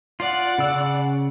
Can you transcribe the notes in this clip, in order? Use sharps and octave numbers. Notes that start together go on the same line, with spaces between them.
F4 D5 F#5
C#3 E6